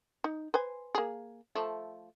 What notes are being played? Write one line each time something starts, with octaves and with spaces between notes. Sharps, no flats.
D#4
B4 C5 G#5
A#3 G#4
F3 A3 E5